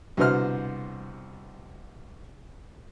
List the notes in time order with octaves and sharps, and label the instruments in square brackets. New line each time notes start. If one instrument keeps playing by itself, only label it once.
[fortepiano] C2 B2 D3 B3 C5 F6